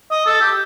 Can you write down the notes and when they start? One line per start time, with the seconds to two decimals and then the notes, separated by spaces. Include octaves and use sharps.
0.11 D#5
0.26 A4
0.41 G4